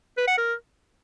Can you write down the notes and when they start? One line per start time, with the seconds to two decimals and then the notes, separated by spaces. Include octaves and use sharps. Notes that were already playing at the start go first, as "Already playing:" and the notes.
0.18 B4
0.28 F#5
0.38 A#4